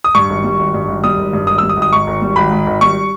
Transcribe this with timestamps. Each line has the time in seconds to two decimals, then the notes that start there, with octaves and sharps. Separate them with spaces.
0.04 D#6
0.15 G2 C#6
0.29 G#1
0.44 G3
0.59 G#1
0.74 G2
0.88 G#1
1.04 G3 D#6
1.18 G#1
1.33 G2
1.47 G#1 D#6
1.58 G3 E6
1.69 D#6
1.77 G#1
1.82 D#6
1.92 G#2 C#6
2.07 G#1
2.22 G3
2.36 G#1 B5
2.51 G#2
2.67 G#1
2.81 G3 C#6